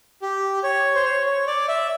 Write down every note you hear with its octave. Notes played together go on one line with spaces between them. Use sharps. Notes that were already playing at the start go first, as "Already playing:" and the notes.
G4
C#5
C5
C#5
C#5
D5
E5